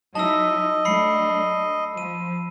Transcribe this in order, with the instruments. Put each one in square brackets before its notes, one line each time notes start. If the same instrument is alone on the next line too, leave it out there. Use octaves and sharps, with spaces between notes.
[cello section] F#3 D#4 E4 [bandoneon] D#5 [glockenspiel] A5 E6
[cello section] F#3 A3 D4 [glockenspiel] B5 C7 C#7
[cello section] F3 [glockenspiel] D#7